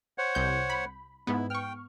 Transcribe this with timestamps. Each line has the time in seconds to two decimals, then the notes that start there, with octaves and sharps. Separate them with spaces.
0.18 C5 C#5 F#5
0.35 C2 G6
0.70 B5
1.27 G#2 B3 E4
1.50 G5 C#6 F6